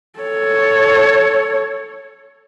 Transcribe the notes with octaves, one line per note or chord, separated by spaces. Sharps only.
A4 C#5